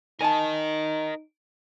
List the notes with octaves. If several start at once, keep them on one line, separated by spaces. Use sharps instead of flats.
D#4 A#4 D#5 G#5 A5